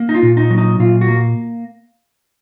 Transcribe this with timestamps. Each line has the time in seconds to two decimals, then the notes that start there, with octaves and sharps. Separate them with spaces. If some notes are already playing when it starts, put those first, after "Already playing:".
Already playing: A#3
0.09 D#4
0.14 F4
0.23 A#2
0.37 D#4
0.50 F#3
0.58 D#4
0.79 A#2 F4
1.01 F#4
1.08 A#3